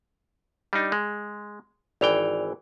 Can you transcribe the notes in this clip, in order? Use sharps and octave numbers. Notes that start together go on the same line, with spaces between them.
G3 D4 D#4
G#3
G#1 E3 D5 G5 F7